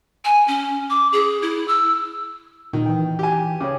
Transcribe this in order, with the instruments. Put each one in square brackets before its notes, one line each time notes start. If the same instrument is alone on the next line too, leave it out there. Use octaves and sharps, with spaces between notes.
[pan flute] G#5
C#4
D6
G#4
E4
E6
[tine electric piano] A#2 [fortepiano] D#3
[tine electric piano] E3 G5
[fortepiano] G4 G#5
[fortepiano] C#3 [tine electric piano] C#5 G5 D6